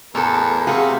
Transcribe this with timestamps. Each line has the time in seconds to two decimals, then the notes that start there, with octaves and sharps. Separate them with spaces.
0.15 E2 A2 A4 A#4
0.67 C3 A3 F#4 G#4 F5